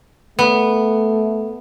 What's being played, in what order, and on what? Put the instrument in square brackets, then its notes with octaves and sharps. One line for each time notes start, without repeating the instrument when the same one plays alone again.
[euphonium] A3 [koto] B3